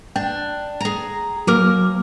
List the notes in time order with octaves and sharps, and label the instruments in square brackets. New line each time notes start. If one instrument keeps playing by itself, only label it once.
[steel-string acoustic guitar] D4 [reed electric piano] G5
[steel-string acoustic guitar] G#4 A#5
[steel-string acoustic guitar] D#2 A#3 A#4 [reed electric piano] F#3 D6 F6